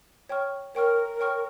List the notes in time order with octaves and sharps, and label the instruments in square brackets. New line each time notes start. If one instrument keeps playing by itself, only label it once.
[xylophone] C#5 G5 C#6 F6
[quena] A#4 [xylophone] C#5 G5 C#6 F6
[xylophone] C#5 G5 C#6 F6